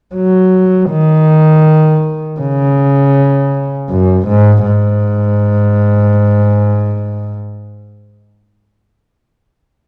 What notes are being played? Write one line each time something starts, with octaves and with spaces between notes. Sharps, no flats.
F#3
D#3
C#3
F#2
G#2
G#2